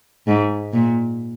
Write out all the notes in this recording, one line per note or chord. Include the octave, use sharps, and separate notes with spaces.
G#2
A#2